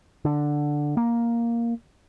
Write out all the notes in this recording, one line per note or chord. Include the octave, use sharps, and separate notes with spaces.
D3
A#3